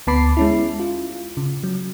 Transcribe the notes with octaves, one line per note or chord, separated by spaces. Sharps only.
D2 B3 A5 B5 D6 C7
G#3 C#4 E4
F4
C#3
F#3